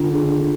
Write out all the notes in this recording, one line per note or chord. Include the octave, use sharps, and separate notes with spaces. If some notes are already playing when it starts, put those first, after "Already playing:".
Already playing: D3 F4
G#4